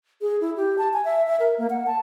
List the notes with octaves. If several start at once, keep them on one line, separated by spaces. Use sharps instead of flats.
G#4
E4
G4
A5
G#5
E5
E5
A#4
A#3
F#5
A5